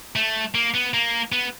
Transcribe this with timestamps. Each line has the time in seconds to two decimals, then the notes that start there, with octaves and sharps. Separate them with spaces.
0.16 A3
0.55 A#3
0.74 B3
0.94 A#3
1.32 B3